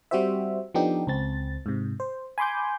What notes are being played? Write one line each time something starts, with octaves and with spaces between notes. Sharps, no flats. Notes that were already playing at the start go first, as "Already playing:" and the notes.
G3 C4 F#4 G4 C5 E5
F3 B3 D4 D#4 G4 A4
C#2 C4 A6
G#2 C3
C5
G#5 B5 C6 D6 G6